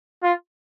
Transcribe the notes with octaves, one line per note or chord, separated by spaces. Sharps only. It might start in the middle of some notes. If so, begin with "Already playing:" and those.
F4